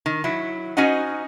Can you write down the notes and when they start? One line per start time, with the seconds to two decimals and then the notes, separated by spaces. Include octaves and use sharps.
0.06 D#3
0.24 F#3 E4
0.77 C#4 D#4 F#4 C5 D#5 F#5